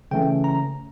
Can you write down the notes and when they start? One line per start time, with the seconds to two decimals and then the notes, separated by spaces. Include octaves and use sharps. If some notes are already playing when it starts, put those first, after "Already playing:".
0.11 C#3 E3 A3 C#4 G5
0.44 A#5